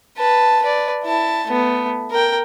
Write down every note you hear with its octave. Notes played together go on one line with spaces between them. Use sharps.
B4 A5
B4 D5
E4 A5
A3 B3
A#4 G5